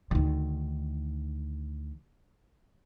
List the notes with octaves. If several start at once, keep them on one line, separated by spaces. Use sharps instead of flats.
D2 D#3